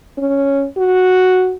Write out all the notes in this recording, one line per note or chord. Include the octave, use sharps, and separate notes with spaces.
C#4
F#4